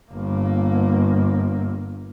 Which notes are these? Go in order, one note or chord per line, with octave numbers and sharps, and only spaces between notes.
G1 A#3